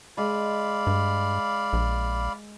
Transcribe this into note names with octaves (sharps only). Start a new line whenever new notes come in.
G#3 D5 F5 B5
G2
A#1